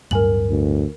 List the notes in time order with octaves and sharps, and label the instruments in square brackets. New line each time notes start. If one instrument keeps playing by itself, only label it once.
[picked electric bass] D1 G2 [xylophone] A#4 G#5 F#7
[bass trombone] D2